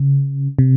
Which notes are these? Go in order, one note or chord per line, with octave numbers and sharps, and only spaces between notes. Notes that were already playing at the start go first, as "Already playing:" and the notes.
Already playing: C#3
C3